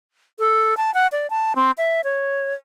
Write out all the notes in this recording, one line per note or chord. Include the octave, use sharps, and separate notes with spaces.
A4
A5
F#5
D5
A5
C4
E5
C#5